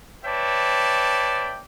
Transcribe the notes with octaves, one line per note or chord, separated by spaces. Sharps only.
B4 C#5 D5 E5 G5 A5